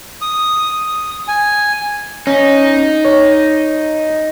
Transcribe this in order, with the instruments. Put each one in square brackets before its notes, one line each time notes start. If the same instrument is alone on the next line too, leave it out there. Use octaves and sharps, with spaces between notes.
[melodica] D#6
G#5
[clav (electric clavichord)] C#4 [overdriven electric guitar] D#4
[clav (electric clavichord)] C#5